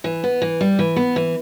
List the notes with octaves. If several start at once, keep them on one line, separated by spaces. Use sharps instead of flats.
E3
B3
E3
G3
E3
B3
E3